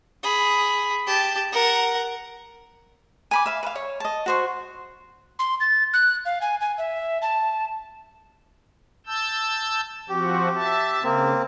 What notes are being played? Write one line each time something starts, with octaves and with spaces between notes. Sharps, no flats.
G#4 B5
G4 A5
A#4 F#5
G#5 B5 D6
E5 F5
B4 F5
C#5
D#5 A5
F#4 C5 C#6
C6
A6
F#6
F5
G#5
G#5
E5
A5
A5 E6 G6
F3 C4 F#4 G4
E5 A5
C#3 A#3 C4